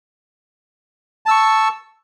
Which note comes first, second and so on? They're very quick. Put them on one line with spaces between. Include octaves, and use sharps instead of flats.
A5 E6 C#6